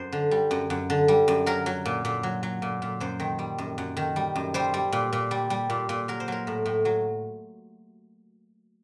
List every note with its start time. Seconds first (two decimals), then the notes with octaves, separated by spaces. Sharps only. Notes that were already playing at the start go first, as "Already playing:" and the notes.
Already playing: F#2 C5
0.12 D3
0.31 G3
0.51 F#2
0.70 F#2
0.90 D3
1.08 G3
1.28 F#2
1.46 F#3 A#4
1.66 F#3
1.86 A#2
2.05 A#2
2.23 F#3
2.43 F#3
2.62 A#2
2.82 A#2
3.00 F#2 C5
3.20 D#3
3.39 G3
3.58 F#2
3.78 F#2
3.97 D#3
4.16 G3
4.36 F#2
4.54 G3 C5
4.74 G3
4.92 A#2
5.13 A#2
5.31 G3
5.50 G3
5.70 A#2
5.89 A#2
6.08 F#3 A#4
6.20 C5
6.28 F#3 A#4
6.47 A2
6.66 A2
6.85 F#3